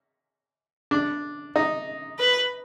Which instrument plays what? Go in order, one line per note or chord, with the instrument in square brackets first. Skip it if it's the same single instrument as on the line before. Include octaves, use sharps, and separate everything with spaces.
[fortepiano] D4
D#4
[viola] B4